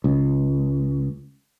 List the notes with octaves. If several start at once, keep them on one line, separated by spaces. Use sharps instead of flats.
C#2